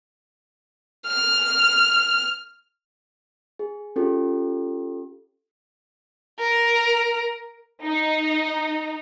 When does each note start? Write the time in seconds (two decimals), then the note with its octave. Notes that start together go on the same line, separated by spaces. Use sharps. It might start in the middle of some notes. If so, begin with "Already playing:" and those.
1.08 F6
3.59 G#4
3.96 C#4 F4 G4 A4
6.39 A#4
7.85 D#4